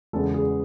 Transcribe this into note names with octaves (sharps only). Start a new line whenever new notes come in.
E2 C#3 G#3 B3 A4
G#4